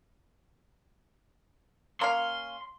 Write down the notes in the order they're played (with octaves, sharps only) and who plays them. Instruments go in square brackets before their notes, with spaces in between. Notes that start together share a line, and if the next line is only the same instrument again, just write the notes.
[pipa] A#3 C#4 F5 [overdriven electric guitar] C6